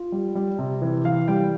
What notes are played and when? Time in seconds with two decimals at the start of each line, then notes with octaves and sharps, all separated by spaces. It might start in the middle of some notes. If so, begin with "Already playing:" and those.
Already playing: F4
0.12 G3
0.35 G3
0.59 C3
0.82 E3
1.05 E3 F5
1.28 G3 G5